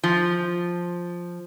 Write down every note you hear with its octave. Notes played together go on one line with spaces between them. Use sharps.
F3